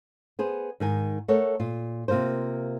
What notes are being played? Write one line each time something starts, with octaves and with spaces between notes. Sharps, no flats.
B3 G#4 C5
G#2 D#3 G#5
A3 A4 A#4 C#5 F#5
A#2 F4
C3 A#3 F4 A#4 C5